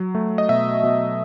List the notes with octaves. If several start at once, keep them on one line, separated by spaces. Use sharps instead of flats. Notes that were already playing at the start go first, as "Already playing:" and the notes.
Already playing: F#3
A3
D#5
B2 E5
B2